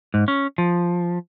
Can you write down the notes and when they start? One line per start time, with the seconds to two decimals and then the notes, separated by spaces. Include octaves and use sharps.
0.14 G#2
0.28 C#4
0.58 F3